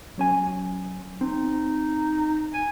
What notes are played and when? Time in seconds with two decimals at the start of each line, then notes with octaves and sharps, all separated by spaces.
0.18 F#3 C#4 G#5
1.21 C4 D#4
2.54 G#5